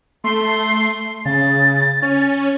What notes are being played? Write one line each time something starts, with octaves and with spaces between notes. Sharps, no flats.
A3 C6
C#3 A6
C#4